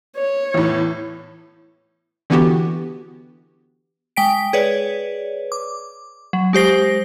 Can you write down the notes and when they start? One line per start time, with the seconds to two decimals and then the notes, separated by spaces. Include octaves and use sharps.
0.17 C#5
0.54 E2 A2
2.30 D3 E3 B3 F#4 G4
4.16 G#3 G5 B6 D7
4.53 G#4 B4 C#5 D5
5.52 D6
6.33 F#3
6.53 G#3 G4 C5 A#6